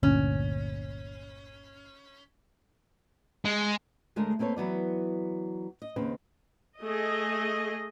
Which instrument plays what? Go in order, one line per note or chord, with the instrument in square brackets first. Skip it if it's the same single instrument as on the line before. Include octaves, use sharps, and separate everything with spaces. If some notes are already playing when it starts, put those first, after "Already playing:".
[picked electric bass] G1 D2 A#2 [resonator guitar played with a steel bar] C#4
[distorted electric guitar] G#3
[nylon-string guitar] D2 G#3 A3 D4 G#4 A#4
A#3 C4 A4 B4 C#5
E3 F#3 B3 D5
D#5
D#2 C#3 C4 B4
[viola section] A3 G#4 D#5